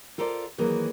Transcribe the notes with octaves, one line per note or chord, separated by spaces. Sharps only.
F4 A4 A#4 C5 D5
D#3 E3 F#3 A#3 G#4